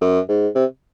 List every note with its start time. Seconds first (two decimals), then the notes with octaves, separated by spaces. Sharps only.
0.01 F#2
0.29 G#2
0.55 C3